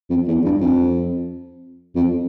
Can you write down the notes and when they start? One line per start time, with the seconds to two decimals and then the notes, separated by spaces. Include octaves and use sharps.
0.10 F2
0.28 E2
0.45 G2
0.61 F2
1.95 F2